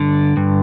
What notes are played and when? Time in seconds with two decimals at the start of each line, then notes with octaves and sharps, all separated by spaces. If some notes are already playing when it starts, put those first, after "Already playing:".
Already playing: G2 D3
0.37 G2